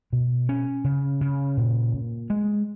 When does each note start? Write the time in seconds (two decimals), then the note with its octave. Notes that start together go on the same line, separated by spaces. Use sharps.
0.13 B2
0.49 C#4
0.84 C#3
1.21 C#3
1.57 A#2
1.93 A#2
2.30 G#3